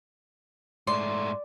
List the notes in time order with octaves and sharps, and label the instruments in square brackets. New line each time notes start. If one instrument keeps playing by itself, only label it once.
[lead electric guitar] G#2 A3 [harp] D5 [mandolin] C6